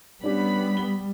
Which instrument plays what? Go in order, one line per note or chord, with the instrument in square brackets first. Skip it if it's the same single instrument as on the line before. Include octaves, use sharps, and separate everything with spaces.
[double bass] G3 [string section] B3 B5 [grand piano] C#4 D4 G4
[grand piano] G7